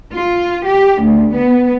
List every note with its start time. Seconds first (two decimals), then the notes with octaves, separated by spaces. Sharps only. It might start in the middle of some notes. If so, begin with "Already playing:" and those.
0.13 F4
0.66 G4
1.02 D2
1.35 B3